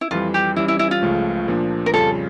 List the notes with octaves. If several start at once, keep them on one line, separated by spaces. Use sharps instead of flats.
E4
F2 E3 G3 F4
G4
E3 G3 C#4 E4
E4
E4
F4
C#2 C#3 F3 A3
A#2 F3 A#3 D4
A#4
F2 C#3 G3 C#4 F4 A4